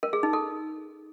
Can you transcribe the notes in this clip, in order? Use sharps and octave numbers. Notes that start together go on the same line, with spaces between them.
A#4
G#4
D#4
A4